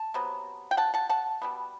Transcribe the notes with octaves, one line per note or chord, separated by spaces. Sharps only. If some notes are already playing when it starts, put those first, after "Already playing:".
Already playing: A5
C3 F#3 B3
G5
F#5 A5
F#5 A5
F#5 A5
B2 G3 B3